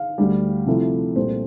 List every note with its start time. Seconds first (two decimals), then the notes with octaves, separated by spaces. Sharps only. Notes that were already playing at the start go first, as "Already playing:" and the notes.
Already playing: F5
0.18 D2 D3 G3
0.67 C3 F3 A3 E4
1.16 C2 A#2 A3 C5